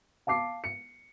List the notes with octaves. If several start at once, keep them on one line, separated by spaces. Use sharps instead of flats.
F5 A5 D6 C7
C#7